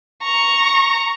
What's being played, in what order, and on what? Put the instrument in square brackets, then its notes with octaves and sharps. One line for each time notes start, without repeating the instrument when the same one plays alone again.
[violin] A#5 C#6